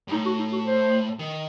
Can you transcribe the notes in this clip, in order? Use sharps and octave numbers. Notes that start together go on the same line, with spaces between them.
G2
A2 D#4
F#4
D#4
F#4
C5
D#3